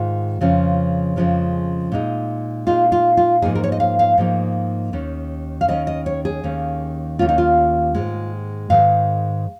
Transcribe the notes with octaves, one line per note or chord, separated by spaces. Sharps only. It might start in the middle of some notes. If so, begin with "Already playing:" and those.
Already playing: G#2 D#3 G#3 F4
F2 C#3 F3 G#3 C#4
F2 C#3 F3 G#3 C#4
A#2 G#3 D#4
A#2 G#3 D#4 F4
F4
F4
G#2 F3 A#3 D#4 G#4
A#4
C#5
D#5
F5
F5
G#2 F3 A#3 D#4
D#2 D#3 C#4
F5
D#2 D#3 C#4 D#5
D#5
C#5
G#4
D#2 D#3 A#3 C#4
D#2 D#3 A#3 C#4 F4
D#4
F4
G#2 D#3 G#3
G#2 D#3 G#3 F5